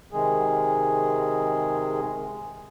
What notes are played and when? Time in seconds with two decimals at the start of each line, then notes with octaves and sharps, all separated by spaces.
0.12 C3 D#3 G#3 G#4